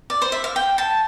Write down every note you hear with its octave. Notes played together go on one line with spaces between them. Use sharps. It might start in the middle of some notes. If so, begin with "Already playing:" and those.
D5
C5
E5
F5
G5
A5